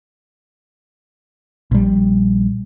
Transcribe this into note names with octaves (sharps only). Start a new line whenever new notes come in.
A#1 G3